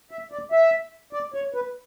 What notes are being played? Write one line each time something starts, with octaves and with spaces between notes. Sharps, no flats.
E5
D5
E5
D5
C#5
B4